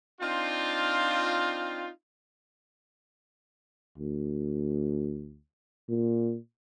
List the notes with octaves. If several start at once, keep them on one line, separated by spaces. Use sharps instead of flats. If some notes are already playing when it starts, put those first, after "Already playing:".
C4 D4 D#4 F4
D2
A#2